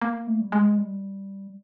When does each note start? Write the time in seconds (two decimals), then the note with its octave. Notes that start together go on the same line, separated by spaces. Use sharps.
0.02 A#3
0.27 A3
0.41 G3
0.52 G#3
0.78 G3